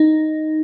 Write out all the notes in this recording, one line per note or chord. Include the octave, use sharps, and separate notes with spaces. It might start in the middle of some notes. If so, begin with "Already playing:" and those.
Already playing: D#4